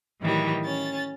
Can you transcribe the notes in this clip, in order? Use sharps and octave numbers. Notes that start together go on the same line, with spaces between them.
A2 D#3 E3 F#3 G3
C#4 A6